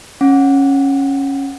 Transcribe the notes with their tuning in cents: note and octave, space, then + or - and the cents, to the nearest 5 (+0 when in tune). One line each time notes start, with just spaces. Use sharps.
C#4 -10 F#5 -15